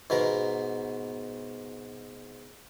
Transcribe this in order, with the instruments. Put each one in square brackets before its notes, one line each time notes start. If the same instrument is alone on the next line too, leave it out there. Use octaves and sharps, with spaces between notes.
[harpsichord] G#2 B2 B3 A#4